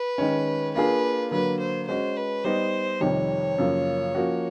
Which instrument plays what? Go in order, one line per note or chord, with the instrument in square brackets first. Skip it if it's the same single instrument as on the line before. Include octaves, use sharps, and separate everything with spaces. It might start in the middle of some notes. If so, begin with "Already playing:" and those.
Already playing: [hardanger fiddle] B4
[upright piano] D#3 G#3 C#4
[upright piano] A#3 D4 F4 G#4 [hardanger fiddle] B4
[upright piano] D3 F#3 A#3 [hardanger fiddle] B4
[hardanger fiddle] C5
[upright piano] G#3 C#4 F#4 [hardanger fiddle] C5
[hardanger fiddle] B4
[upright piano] G3 B3 D#4 [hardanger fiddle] C5
[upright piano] F2 C3 D#3 G3 [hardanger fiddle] C#5
[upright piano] F#2 C#3 F3 A#3
F3 A#3 C#4 F#4